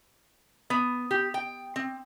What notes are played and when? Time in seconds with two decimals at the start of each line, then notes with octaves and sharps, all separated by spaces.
0.70 B3
1.11 G4
1.34 G5
1.76 C4